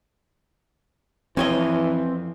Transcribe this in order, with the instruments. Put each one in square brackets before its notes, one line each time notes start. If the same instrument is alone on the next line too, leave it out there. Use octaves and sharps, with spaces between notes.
[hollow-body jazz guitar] F2 C#5 D#5 [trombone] E3 [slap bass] C4